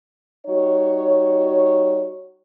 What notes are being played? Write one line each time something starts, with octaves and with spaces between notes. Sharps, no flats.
G3 D#4 F#4 C#5